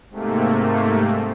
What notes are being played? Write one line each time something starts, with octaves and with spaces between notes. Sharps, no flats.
G#2 C3 A3 A#3